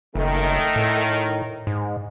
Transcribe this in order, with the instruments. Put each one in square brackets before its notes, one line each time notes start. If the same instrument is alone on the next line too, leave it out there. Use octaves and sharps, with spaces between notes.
[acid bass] F#1 [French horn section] D#3 A3
[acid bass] A2
G#2